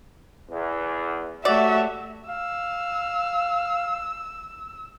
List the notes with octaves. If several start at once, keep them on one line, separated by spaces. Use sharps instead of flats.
E2
A3 F#4 G4 C#5 D5 E5
F5 E6